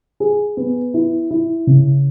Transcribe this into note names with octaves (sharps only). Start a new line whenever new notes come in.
G#4
B3
E4
E4
C#3